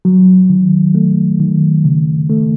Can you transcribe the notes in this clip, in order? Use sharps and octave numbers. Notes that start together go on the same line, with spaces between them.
F#3
D#3
A3
D#3
C#3
A3